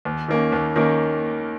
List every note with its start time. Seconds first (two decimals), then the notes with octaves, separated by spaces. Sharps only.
0.05 D#2
0.28 D#3 A#3 C#4
0.52 D#2
0.76 D#3 A#3 C#4